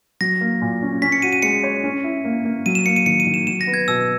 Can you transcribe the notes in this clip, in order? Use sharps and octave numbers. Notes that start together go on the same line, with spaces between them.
F#3 A#6
A#3
A#2
C#4
C#4 B6
C#7
F#4 D#7
D#7
G#3 C#7
C#5
C#4
E4
A#3
A#3
F#3 D#7
E7
A#3 C#7
D#7
D#3 C#7
D#7
D#3
E7
F#3 E7
A#6
B3
G#6
B2 E6